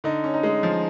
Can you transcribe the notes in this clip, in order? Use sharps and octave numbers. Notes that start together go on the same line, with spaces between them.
D3 D#4
C#4
D#4
G#3
F3